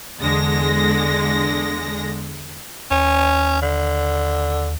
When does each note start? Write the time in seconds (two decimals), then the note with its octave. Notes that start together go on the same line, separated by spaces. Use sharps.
0.21 E2 D3 G#3 A#6
2.91 D#2 C#4
3.62 D3